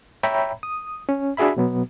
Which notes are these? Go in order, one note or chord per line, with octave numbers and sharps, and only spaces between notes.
C#5 E5 G5 A#5 B5
D#6
C#4
D4 F#4 G#4 E5 B5
B2 F#3 B3